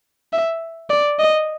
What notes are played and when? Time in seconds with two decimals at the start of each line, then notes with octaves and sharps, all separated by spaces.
0.33 E5
0.90 D5
1.19 D#5